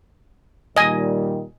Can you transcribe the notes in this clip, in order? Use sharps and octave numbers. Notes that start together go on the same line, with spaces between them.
A#2 D#3 G3 D#5 G#5